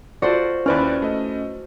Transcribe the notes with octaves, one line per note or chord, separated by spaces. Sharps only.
F4 F#4 A4 C5 D5
D#2 C#4 E4 B4 D5 F6
A3 D#5